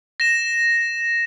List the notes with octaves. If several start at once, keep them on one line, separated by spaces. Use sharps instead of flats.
A#6 E7